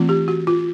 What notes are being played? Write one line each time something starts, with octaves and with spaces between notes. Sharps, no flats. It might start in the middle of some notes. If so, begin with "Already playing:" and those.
Already playing: E3 A3 C4 F4
G4
F#4
F4